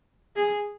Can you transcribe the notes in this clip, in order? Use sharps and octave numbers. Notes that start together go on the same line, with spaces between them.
G#4